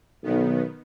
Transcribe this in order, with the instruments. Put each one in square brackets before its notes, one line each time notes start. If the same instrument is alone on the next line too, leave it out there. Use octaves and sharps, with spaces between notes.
[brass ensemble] B1 [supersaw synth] D#3 B3